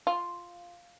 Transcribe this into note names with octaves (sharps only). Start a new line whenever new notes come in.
F4